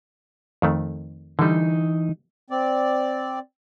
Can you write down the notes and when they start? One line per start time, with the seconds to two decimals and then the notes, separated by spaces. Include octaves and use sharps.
0.62 F2 D#3 A3
1.39 D3 E3 G3 D#4
2.50 C4 D5